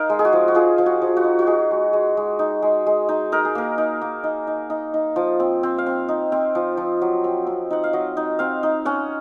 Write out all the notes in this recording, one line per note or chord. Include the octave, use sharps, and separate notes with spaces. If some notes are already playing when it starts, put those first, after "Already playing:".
Already playing: D#4 A#4 F5
G#3
G#4
F#4
F3
F#4
F3 G#4
F3
F#4
F3
F#4
D#4
F#4
D#4 G#4
G#3
G#3
G#3
D#4
G#3
G#3
D#4
D#4 A#4
G#4
A#3 A#4
D#4
A#3
D#4
D#4
D#4
D#4
F3
C4
C4
F5
C4
D#4
C4
F3
F3
F#3
C4
C4
D#4 F#5
F5
F#3 D#5
D#4
C4 F5
D#4
C#4 F#5